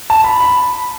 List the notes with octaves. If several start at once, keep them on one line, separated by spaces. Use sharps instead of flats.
A5
B5
B5